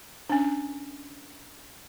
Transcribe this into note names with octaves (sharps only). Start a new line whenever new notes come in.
C#4 D4